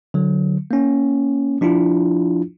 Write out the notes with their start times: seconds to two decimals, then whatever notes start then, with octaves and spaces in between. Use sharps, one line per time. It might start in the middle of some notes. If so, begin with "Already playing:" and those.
0.14 D3 F#3
0.71 A#3 C#4
1.61 F3 D4 E4 F4